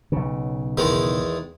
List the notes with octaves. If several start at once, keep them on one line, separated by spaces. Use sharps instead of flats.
B1 C#3
E2 D#3 G#3